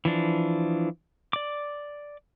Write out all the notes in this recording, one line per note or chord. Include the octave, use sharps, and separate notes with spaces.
E3 F3 D4
D5 D6